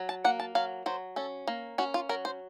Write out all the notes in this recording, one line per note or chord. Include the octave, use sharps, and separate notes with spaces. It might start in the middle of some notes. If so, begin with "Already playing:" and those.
Already playing: F#3
A5
A#3 F#5
A5
F#3 F5
F#3 C5
C#4 A4
A#3
C#4 F#4
F4
F#3 A#4
C5